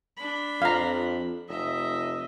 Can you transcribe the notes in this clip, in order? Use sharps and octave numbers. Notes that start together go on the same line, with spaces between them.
D4 B5
F2 F5 A#5
F1 D#5 E5